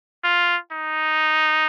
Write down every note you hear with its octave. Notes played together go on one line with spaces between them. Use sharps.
F4
D#4